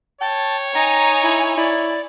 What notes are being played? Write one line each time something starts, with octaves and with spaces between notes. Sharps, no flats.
C#5 G5 A5
D#4 G5 G#5 A#5
E4
E4 D5